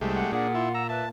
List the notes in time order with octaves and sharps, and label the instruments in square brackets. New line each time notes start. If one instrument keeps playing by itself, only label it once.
[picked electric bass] C2 [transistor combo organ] G#3 A3 G4 [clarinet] E5
[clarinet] F#5
[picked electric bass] A#2 [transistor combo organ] D4 [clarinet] G#4 [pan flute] F#5
[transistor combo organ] E4 [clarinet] F4
[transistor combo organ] A#5 [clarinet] E6
[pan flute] B4 [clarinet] E5 [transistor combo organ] A5